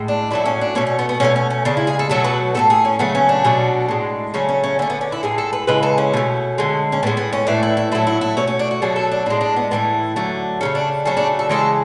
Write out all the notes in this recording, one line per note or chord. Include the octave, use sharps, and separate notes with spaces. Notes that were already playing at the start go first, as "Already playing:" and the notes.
Already playing: A2 G#3
D4
A2 F#3 A3 E4
C#4
D4
B2 A3 C#4
C#4
B3
B3
B2 F#3 A3 C#4
C#4
C#4
C#3 G#3 D4
E4
G#4
A4
B2 F#3 A3 A4
B4
A2 E3 A3 A4
G#4
C#4
C#3 F#3 A3 B3
C#4
D4
B2 F#3 A3
A2 G#3
C#3 F#3 A3 C#4
C#4
C#4
D3 A3 B3
B3
C#4
E4
A2 G#3 G#4
A4
B4
C#3 E3 G#3 B4
A4
C#4
B2 A3
D3 G#3
C#4
A2 G#3 B3
B3
C#4
A2 E3 A3 D4
E4
E4
A2 F#3 A3 E4
E4
E4
B2 A3 C#4
C#4
D4
F#4
B2 F#3 A3 G#4
A4
D4
A2 G#3 D4
D4
B3
A2 E3 A3 B3
D3 F#3 A3
C#3 F#3 A3 C#4
D4
C#3 F#3 A3 A4
D4
A4
C#3 E3 G#3 A4